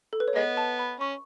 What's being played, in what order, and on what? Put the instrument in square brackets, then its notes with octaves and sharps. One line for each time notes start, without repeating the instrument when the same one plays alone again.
[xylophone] A4
B4
C#5
[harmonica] G#3 B3 [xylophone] D#5
[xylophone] A5
B5
[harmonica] C#4 [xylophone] C#6